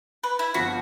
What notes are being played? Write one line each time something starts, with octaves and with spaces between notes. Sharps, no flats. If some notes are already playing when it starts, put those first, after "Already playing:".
B4
E4
G1 F3 F#4 B6